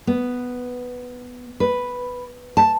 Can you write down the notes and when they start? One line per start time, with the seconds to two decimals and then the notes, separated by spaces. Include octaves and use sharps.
0.07 B3
1.60 B4
2.57 A5